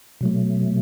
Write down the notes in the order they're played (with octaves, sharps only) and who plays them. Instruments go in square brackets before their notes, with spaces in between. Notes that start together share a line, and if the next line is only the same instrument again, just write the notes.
[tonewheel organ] B2 F#3 A3